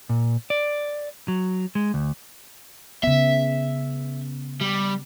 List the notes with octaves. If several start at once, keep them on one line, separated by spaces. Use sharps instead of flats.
A#2
D5
F#3
G#3
D2
C#3 B3 E5
G3